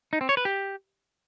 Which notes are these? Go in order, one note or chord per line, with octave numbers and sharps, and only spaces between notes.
D#4
C4
C#5
B4
G4